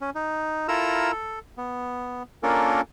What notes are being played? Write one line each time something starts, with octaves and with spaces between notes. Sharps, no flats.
C#4
D#4
E4 F4 A4 A#4 A#5 E6
A4
B3
A#3 C#4 D4 F4 A4 A#4